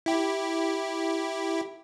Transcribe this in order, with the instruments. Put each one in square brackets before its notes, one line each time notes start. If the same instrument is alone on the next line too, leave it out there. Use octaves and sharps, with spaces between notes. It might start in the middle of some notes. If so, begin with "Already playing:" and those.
[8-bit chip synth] E4 G4